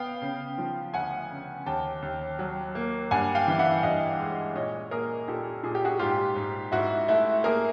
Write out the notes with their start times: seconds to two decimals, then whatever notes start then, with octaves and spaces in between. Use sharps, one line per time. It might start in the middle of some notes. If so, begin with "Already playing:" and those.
Already playing: B3 F5 G5
0.22 C#3
0.58 F3
0.94 D2 F#5 G#5
1.31 C#3
1.66 D#2 G5 A5
2.02 D#2
2.39 F#3
2.75 A#3
3.11 G2 F#5 G#5
3.35 F5 G5
3.47 E3
3.59 E5 F#5
3.83 G2 D#5 F5
4.20 G#3
4.55 A#2 C#5 D#5
4.91 A#3 G#4 A#4
5.28 A#2 G4 A4
5.63 A#2 G#4
5.75 G4
5.85 F#4 G#4
5.99 G#2 F4 G4
6.36 G#2
6.72 G#2 E4 F#4
7.08 A3 E4
7.44 A#3 G#4 A#4